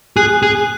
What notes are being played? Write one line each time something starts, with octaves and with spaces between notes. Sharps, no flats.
G#4 F#6
G#4